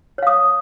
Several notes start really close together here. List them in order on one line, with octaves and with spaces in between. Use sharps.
C#5 F5 D#6